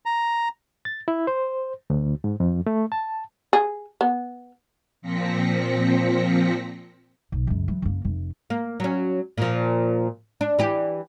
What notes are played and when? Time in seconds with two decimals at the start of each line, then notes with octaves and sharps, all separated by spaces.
0.06 A#5
0.85 A6
1.08 E4
1.27 C5
1.90 D2
2.24 G#2
2.40 F2
2.67 A3
2.92 A5
3.53 G#4
4.01 B3
5.02 A#2 F3 C4 A#6 B6 C#7
7.32 B1
7.47 C#2 F#2
7.68 E3 F#3
7.82 F#1 A#3
8.05 F1
8.50 A#3
8.80 F#3 C#4
9.38 A#2 F3
10.41 D4
10.59 E3 G4